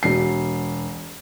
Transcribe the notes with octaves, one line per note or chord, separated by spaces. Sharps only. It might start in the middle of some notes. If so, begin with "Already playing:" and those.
E1 C7